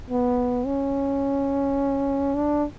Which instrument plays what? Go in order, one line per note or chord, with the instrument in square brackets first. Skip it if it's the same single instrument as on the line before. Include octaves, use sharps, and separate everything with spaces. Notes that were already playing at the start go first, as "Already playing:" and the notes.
[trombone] B3
C#4
D4